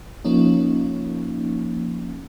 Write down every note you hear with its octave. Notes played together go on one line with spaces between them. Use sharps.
F3 A#3 C#4 D#4